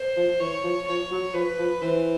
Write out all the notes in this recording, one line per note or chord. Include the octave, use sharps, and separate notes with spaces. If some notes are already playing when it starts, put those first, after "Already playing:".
Already playing: C5
F3
E3 C#5
F3
F3 C#5
F#3
F3 B4
F3
E3 C5